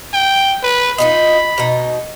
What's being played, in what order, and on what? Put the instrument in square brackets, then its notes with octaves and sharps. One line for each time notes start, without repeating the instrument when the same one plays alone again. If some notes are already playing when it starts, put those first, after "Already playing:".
[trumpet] G5
B4
[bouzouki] D#4 F4 D#5 [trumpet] B5
[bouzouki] B2 D#4